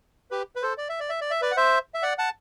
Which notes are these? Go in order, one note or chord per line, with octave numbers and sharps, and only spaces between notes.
G4 B4
B4
A4 C5
D5
E5
D5
E5
D5
E5
B4 D5
F#5
C5 E5
E5
D5 F#5
F#5 A5